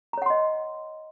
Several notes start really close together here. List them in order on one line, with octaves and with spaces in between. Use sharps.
A#5 C#5 F#5 C6 D#5